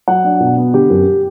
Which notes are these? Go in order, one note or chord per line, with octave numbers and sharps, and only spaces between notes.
F#3 F#5
D4
B2
B3
D3 G4
F#2